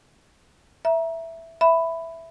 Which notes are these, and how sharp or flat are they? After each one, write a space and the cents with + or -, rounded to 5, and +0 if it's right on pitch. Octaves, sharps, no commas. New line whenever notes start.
E5 +0 A#5 +25
E5 +0 B5 +10